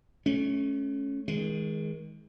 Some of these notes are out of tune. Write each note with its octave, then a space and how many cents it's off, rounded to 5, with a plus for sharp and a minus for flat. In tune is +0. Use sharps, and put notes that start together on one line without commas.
A3 -35 C#4 +0
D#3 +30 G#3 +0